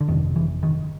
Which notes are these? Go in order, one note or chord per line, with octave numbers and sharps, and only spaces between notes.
D3
G1 F2 C3 D#3
E3
D#3